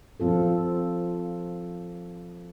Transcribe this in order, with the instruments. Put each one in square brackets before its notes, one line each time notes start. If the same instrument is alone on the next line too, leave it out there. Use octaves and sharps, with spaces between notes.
[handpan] F3 C4 F4 A4